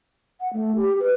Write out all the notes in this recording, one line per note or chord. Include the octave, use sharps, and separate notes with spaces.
F#5
A3
G4
B4